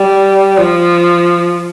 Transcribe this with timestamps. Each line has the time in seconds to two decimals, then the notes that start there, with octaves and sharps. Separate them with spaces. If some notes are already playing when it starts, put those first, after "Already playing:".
Already playing: G3
0.58 F3